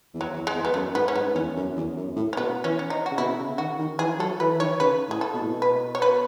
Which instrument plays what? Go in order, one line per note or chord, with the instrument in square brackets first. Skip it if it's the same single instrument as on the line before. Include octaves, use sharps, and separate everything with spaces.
[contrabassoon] E2
[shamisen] F#3
[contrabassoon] E2
[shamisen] G#3
[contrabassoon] E2
[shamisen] B3
[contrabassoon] F#2 [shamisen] A3
[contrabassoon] G#2 [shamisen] B3
[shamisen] C#4
[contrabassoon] G#2 [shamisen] B3
[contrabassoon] E2 [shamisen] C#4
[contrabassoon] F#2
E2
F#2
A2
[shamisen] C#4
[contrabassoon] B2 [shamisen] B3
[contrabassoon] E3 [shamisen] C#4
[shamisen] C#4
D#4
F#4
[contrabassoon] C#3
[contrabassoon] B2 [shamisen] E4
[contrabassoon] C#3
[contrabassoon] D#3 [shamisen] F#4
[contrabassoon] D#3
[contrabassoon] E3 [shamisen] G#4
[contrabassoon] F#3 [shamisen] A4
[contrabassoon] E3 [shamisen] B4
[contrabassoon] E3
[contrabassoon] D#3 [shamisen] C#5
[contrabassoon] C#3 [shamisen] B4
[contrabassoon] A2 [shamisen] G#4
[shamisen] A4
[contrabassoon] B2
A2
B2
[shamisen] B4
C#5
B4